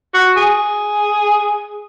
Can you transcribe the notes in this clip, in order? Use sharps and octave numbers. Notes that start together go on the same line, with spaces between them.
F#4
G#4